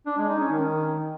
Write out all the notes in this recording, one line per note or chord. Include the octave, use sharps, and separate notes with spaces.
D4
G#3
D#4
C#4
D#3